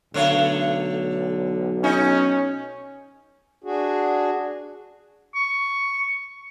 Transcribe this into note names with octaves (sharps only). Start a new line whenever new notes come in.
B1 D3 A3 C#5
C#4 D#4
D4 F#4 G#4
C#6